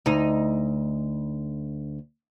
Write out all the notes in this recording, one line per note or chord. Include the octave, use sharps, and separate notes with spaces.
D2 D#4